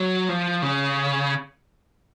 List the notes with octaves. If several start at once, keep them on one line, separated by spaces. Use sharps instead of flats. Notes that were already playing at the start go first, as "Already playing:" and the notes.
Already playing: F#3
F3
C#3